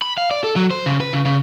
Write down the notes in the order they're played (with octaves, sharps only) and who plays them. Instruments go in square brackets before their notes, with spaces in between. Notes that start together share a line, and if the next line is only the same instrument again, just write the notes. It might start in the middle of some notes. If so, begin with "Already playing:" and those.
[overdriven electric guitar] B5
F5
D5
A4
F#3
C5
C#3
B4
C#3
C#3